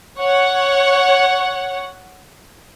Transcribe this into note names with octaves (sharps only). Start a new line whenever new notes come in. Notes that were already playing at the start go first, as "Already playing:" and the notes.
C#5 F#5